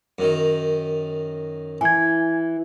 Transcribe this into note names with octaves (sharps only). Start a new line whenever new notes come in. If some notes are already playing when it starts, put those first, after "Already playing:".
F#2 D#3
E3 G#5 G#6